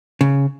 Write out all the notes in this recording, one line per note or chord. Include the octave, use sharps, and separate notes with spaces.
C#3